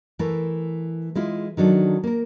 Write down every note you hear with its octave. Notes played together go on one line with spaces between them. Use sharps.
E3 A3 A#4
G#3 E4 F4 G#4
D#3 F#3 D4 D#4 A4
A#3 A#4